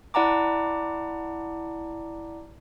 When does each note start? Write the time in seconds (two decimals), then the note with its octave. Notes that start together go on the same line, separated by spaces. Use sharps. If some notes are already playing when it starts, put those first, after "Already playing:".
0.14 E4 D5 F#5 A5 A#5 D6